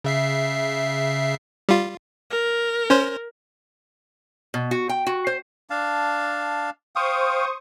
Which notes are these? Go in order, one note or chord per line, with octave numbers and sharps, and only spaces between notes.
C#3 E5 C7
G3 F4
A#4
C#4 C5
B2
F#4
G5
F#4
C5
D4 F5 A5
C5 F5 G5 C#6 D#6